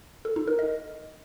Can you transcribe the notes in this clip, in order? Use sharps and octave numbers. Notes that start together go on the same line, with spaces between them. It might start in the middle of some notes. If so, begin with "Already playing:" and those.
A4
D#4
A#4
D#5